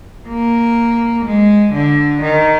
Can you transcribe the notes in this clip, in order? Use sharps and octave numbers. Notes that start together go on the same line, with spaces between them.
A#3
G#3
D3
D#3